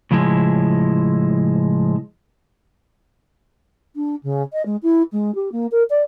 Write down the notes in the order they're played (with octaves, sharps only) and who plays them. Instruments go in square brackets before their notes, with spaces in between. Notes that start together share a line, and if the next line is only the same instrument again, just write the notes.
[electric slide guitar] A2 C#3 F3 G#3 E4
[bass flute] D4
C#3
D#5
G#3
E4
G#3
G4
A#3
A#4
D5